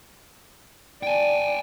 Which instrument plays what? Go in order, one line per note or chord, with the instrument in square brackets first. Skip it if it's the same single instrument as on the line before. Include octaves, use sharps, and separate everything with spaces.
[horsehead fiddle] D5 [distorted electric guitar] G5 G#5